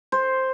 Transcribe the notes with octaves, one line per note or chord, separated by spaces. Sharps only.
C5